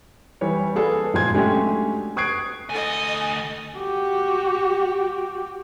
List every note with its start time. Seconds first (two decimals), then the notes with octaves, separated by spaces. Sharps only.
0.41 E3 G3 C#5
0.75 A#3 G#4 A4 B4 D5
1.13 G1 A#2 F3 G#3 C6 G#6
1.33 F#3 G#3 A3 C#4 D4 G4
2.17 C#6 D#6 F#6 G#6 C7 D7
2.70 D2 A4 D#5 G#5
3.77 F#4 G4